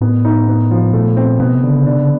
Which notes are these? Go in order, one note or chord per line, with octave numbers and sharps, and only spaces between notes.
A2 B3
D#4
B3
F3
A#2 A3
C4
B2 B3
C3
D3
C#3
C3 D4
C#3